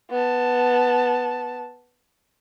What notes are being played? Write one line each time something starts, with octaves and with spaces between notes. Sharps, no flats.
B3 A5